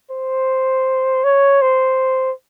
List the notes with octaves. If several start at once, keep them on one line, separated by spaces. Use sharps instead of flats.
C5
C#5
C5